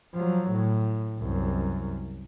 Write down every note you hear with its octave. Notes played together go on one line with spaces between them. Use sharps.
F3 F#3
A2
C2 F#2